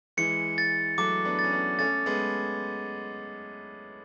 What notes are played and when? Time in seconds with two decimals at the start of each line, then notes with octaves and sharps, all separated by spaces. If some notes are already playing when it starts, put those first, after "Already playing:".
0.17 E3 G#3 C#7
0.58 A6
0.98 F#3 A3 D6
1.25 B3 D4
1.39 A6
1.44 C#4
1.52 B3 D4
1.79 A3 C#4 A6
2.06 G#3 B3